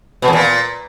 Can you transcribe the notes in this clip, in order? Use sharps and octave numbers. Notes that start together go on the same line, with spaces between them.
B2
E2
A#2